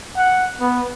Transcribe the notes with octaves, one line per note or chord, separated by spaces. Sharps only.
F#5
B3